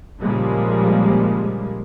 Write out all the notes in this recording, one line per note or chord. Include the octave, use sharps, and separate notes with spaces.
A#2 C#3 F3 G3 G#3 A#3